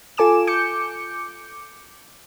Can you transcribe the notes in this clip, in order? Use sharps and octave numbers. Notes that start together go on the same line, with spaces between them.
F4 A4 G#5 D6 E7
D6 G6 C#7